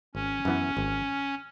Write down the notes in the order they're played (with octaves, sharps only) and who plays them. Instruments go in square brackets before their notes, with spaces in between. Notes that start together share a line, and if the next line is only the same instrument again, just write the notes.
[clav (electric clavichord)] G#1 [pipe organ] C#4
[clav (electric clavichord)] F#2 E3 B3
G#1